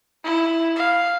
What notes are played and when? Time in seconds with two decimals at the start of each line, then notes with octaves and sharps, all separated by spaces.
0.24 E4
0.76 F5